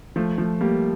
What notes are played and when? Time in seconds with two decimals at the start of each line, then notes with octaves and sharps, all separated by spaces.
0.16 F3 A3
0.38 F3 A3
0.61 G3 A#3